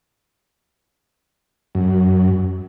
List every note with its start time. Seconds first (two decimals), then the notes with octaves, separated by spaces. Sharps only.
1.75 F#2